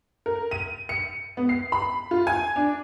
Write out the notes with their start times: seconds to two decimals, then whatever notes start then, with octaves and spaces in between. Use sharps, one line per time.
0.26 A#4
0.51 D#7
0.89 C#7
1.37 B3
1.49 C7
1.72 B5
2.11 F4
2.27 G#5
2.56 D4